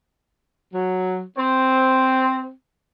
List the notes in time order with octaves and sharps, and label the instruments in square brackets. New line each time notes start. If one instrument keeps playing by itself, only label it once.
[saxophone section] F#3
[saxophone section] C4 [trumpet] C5